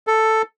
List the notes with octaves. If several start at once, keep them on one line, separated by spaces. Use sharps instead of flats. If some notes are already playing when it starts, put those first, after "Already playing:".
A4